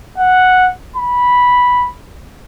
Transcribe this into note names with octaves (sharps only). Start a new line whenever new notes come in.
F#5
B5